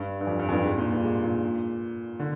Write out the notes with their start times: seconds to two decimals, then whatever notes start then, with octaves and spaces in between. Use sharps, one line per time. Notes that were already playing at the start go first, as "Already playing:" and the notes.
Already playing: G2
0.21 G2
0.27 F2
0.39 G2
0.49 F2
0.52 G2
0.65 G#2
0.78 A#2
0.91 G2
1.04 G#2
1.24 A#2
2.19 D3